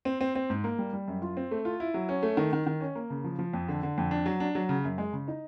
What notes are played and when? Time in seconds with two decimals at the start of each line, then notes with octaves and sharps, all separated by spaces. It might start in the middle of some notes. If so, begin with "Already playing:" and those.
0.05 C4
0.21 C4
0.35 C4
0.50 G#2
0.64 A#3
0.79 G3
0.93 G3
1.08 F#2
1.22 F4
1.37 C4
1.51 A3
1.65 F4
1.80 E4
1.94 F#3
2.09 C#4
2.23 A3
2.37 D#3
2.53 D#3
2.66 D#3
2.81 C#4
2.95 A#3
3.10 C#3
3.24 F3
3.39 F3
3.53 F2
3.68 D3
3.83 D3
3.98 F2
4.11 D4
4.26 F#3
4.40 D4
4.55 F#3
4.69 C#3
4.84 F#2
4.98 G#3
5.13 C#3
5.28 D#4